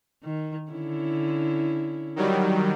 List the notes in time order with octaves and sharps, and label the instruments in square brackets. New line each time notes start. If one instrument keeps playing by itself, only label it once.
[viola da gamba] D#3
D3 C#4 E4
[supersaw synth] D#3 F#3 G3